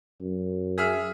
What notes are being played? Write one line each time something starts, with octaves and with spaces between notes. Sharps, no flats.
F#2
G#4 E5 F6